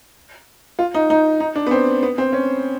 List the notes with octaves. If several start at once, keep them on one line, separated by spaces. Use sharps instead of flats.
F4
D#4
D#4
D#4
D4
B3
C4
B3
C4
C#4